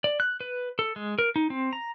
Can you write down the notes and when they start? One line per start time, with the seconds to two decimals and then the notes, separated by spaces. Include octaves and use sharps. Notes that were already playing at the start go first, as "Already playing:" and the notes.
0.04 D5
0.20 F#6
0.41 B4
0.79 A4
0.96 G#3
1.19 A#4
1.36 D#4
1.50 C4
1.73 A#5